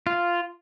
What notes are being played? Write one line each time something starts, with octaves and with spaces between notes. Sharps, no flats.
F4